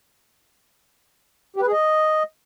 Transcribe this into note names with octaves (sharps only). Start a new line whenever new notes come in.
G4
B4
G#4
D#5